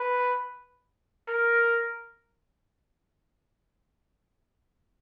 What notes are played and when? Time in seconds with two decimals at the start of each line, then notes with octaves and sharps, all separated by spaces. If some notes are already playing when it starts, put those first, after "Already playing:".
Already playing: B4
1.28 A#4